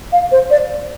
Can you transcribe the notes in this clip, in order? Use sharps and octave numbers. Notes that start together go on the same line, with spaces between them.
F5
C5
D5